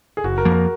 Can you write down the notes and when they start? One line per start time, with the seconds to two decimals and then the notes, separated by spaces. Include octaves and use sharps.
0.17 G#4
0.24 F#1 F#4
0.38 A#4
0.45 F2 F3 A#3
0.52 A#4